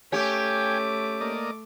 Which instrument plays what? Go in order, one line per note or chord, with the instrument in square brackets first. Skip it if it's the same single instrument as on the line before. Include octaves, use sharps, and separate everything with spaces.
[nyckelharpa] A3 D6 [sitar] C#4 G4 [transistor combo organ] G5 G#5
[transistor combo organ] A#3 D5 D#5